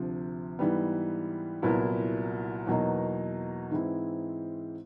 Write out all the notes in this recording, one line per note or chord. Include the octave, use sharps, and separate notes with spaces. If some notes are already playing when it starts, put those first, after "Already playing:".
Already playing: D2 C3 F3
G#2 E3 G3 B3
C2 A#2 F#3 B3 E4
E2 B2 F#3 A#3 D#4
G#2 E3 G#3 C4 E4